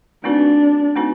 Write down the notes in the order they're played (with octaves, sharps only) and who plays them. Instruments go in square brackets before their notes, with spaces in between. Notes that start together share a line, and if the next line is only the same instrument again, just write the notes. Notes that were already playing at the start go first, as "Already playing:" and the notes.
[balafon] A3 C4 D#4 F#4 B4 [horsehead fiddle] D4
[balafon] A3 C4 D#4 F#4 B4